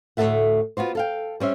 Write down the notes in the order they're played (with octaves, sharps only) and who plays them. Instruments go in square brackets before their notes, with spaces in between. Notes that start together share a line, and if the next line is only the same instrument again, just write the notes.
[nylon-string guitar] D2 A2 A3 A4 E5 F#5
B3 F4 F#4 C5
A4 F5 G5
G3 C#4 C5 E5